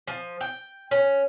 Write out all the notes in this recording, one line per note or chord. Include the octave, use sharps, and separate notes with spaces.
F3
G5
C#4